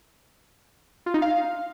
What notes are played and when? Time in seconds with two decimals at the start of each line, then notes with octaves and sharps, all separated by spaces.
1.06 F4
1.14 D#4
1.22 F5